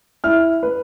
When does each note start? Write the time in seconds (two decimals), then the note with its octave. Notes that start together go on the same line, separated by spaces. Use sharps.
0.24 E4 F6
0.63 B4